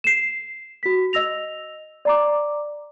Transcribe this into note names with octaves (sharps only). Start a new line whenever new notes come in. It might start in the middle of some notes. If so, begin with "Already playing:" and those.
C7 E7
F#4 B6
D#5 E6 A#6 F7
D5 A#5 D6